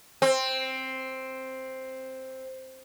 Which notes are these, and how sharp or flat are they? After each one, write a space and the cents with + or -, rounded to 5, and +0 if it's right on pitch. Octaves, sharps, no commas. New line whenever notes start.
C4 +5